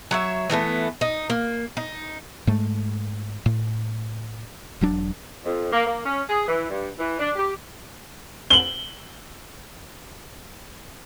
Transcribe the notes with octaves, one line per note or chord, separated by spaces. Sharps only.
F#3 C#5 E5
E3 G3 A3 B3
D#4
A#3
D#4
G#2 G#3 A3
A2
E1 F#3 D4
F2
A#3
A#3
C#4
G#4
E3
G2
E3
D4
G4
F#7 G7